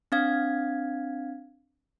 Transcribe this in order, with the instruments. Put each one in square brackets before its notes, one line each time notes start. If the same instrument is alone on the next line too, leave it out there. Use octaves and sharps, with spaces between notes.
[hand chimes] C4 D4 F5 G#6